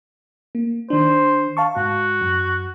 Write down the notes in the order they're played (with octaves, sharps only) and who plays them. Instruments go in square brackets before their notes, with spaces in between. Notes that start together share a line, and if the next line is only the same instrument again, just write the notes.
[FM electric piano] A#3
[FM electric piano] D#3 D4 [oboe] C5
[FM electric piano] F5 A5 C#6
[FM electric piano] G#2 [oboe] F#4
[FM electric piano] F#2